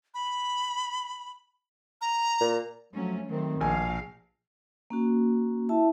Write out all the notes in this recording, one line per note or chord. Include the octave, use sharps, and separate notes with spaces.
B5
A#5
A#2
F3 F#3 A3 C#4
D#3 F#3 A3 C4
A#1 B2 F5 G#5
A#3 C#4 F#4
E4 E5 A5